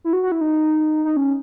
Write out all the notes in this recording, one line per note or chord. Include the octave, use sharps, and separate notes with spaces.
E4
F#4
F#4
E4
D#4
D#4
C#4